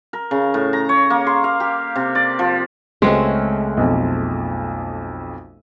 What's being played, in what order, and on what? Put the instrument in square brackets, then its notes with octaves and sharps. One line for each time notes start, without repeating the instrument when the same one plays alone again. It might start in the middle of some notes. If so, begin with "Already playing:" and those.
[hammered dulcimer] A#4
C#3
A2
A#5
C#5
A#3
C6
F5
G4
C3
D5
F3
[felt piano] C#2 [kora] G#3 [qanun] A3 C4 C#4
[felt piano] B1 F2